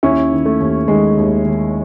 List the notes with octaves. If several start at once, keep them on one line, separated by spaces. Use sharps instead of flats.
D#2 C#4 E4
D#3
A3
D#2
D#3 G#3
D#2
D#3